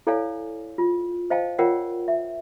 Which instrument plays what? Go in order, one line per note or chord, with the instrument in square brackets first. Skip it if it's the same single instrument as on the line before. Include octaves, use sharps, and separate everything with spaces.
[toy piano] E4 A4 C#5 D5 F5 G#5
F4
C5 D#5 F5 G5 A5
F4 A#4 C#5 D5 F#5 G5
E5